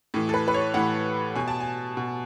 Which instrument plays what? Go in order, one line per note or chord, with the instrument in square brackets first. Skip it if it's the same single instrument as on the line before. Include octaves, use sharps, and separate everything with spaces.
[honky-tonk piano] A2 E3
A4
B4
B4
C#5
A2 E3 F#5
B2 G#5
A5
G#5
B2